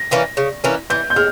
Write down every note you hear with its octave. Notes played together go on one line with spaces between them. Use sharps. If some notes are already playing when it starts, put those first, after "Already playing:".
Already playing: A#6
E3 A#3 C#4
C#3
E3 A#3 C#4
E3 G6
G6
G#3 F6